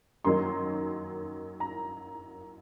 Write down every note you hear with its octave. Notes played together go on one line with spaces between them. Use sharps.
F#2 D#3 F#3 A#3 D#4 C6
A#5